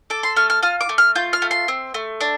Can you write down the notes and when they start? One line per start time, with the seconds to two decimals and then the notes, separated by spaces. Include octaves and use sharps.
0.10 A4 D6
0.23 C6
0.36 A3 F6
0.50 F6
0.63 F4 F6
0.81 D6
0.89 A3
0.98 F6
1.15 F4 G6
1.33 F6
1.42 A3
1.51 C6
1.68 C4
1.94 A3
2.21 D4